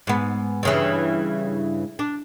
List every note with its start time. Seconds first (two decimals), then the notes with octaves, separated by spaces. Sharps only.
0.07 G#2 B3
0.63 G2 C#3 E3
1.99 D4